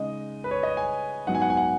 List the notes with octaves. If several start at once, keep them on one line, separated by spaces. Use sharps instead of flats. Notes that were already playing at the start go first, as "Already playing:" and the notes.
Already playing: C#3 G#3 D#4 D#5
B4
C#5
D#5
G#5
G#2 F#3 B3 D#4 F#5
G#5
F#5
G#5
F#5